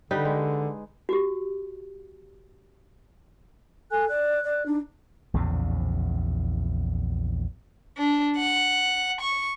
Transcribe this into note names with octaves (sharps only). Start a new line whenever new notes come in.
D3 G3 D#4 B4
G#3
F#4 G4
A4 G#5 F#6
D5 F#6
D5
D4 D#4
A#1 E2 A2 C#3
D4
F#5
C#6